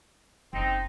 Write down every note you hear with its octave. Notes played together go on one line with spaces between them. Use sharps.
F#1 C4 D#4